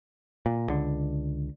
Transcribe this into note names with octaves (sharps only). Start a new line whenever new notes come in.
A#2
C#2 D3